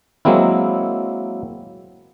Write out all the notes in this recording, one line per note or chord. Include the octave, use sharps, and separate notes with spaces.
F#3 G#3 A#3 C4 E4